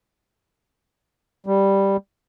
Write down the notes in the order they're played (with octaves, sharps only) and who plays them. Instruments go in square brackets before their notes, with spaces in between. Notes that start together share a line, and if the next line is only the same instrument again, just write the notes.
[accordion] G3